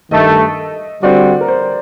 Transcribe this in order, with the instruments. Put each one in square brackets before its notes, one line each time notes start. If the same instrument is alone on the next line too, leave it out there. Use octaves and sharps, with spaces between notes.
[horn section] G2 D#3 A3 [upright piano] D#5
[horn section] D3 G3 C4 F#4 [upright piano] D5
[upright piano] A#4
C5